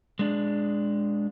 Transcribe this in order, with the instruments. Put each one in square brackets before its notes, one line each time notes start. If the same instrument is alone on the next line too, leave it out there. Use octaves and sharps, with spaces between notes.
[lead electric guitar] G#3 D4